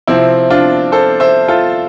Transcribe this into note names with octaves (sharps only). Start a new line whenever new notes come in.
C3 F3 C4 E4
D4 F4
A4 C5
C5 E5
F4 A4